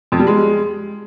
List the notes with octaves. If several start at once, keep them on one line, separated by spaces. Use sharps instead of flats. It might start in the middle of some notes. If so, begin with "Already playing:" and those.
F2
G3
G#3